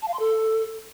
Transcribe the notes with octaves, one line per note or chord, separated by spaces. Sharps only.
A5
F5
C6
A4